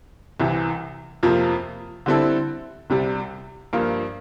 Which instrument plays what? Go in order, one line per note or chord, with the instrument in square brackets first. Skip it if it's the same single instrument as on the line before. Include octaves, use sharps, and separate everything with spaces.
[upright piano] C2 C3 E3
F2 C3 F3 A#3 F4
D3 G3 C4 E4 A4
C2 C3 G3
G2 F3 A#3 F4